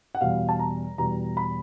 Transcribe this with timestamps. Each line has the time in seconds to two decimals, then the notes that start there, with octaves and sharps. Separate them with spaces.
0.15 F#5
0.21 E2 B2 G3 F5
0.49 A5
0.59 A#5
0.98 E2 B2 G3 A#5
1.37 B5